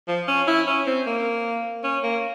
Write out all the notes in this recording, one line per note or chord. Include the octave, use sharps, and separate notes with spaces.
F3
C#4
E4
C#4
C4
A#3
C#4
A#3